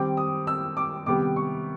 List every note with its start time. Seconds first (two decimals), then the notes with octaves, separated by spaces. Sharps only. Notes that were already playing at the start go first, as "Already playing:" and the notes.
Already playing: D#3 G3 C4 D6
0.17 D#6
0.47 E6
0.77 D6
1.06 C3 D#3 G3 B3 D6
1.36 C#6